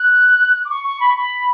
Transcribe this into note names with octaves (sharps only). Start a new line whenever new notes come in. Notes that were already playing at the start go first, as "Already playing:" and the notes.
Already playing: F#6
D6
C#6
C#6
B5
C#6
B5